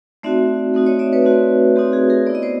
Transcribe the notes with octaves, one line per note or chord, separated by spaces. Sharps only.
A3 C4 D#4 F#4 D5 E5
A3 C4 D#4 F#4
C#5 D#5
D5 E5
B4 C#5
A3 C4 D#4 F#4
A3 C4 D#4 F#4 G4
F#4 G#4
G#4 A#4
B3 E4 D5
D#5
C5 D5